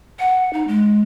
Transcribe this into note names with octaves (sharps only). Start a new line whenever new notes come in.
F#5
D#4
G#3